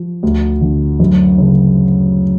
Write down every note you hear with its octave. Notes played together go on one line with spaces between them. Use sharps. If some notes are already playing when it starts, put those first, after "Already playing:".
Already playing: F3
D2
D3
F#2
C#3